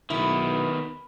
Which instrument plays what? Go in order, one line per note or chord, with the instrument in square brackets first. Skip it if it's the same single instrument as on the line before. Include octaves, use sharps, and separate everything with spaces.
[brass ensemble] B1 [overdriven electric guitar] D#3 B3 [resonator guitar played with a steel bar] E4